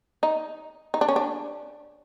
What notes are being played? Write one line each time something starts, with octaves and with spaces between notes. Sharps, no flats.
D#4
D#4
D4
C#4
D4